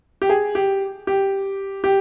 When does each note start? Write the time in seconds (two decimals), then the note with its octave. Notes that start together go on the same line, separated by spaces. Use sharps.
0.22 G4
0.29 G#4
0.55 G4
1.07 G4
1.84 G4